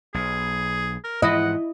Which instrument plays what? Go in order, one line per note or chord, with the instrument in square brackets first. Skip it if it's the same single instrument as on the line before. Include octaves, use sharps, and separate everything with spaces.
[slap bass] B1 [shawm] G#4
[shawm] A#4
[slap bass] G#2 E3 F3 [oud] E4 [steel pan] D#5 [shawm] F#5